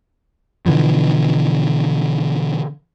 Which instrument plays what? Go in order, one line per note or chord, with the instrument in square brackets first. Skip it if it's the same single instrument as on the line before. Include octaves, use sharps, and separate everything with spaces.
[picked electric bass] B2 D3 E3 F3